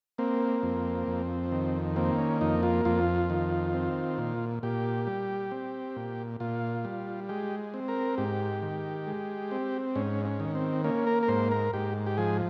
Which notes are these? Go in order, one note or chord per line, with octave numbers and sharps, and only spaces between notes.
A#3 C4
F2
F2
D#3
A#3 C4
C#4
F2 D#4
F4
F2 F4
D#3
C4
A#2
A#2 G4
G3
C4
A#2
A#2 F4
G3
G#3 G4
C4
A#4
G#2 G4
D#3
G#3
C4
G#2 C#4
C#4
D#3
C4
A#3 C#4
A#4
A#4
G#2 C5
A#4
G#2 G4
G4
F3 G#4